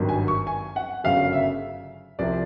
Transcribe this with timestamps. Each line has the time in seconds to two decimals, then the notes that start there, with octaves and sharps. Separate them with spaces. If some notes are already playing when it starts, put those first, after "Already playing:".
Already playing: G#1 G2 D#3 F#3
0.09 G#5
0.28 C#6
0.47 G#5
0.76 F#5
1.04 G1 F#2 C#3 F#3 F5
1.33 E5
2.19 C2 C3 F3 D5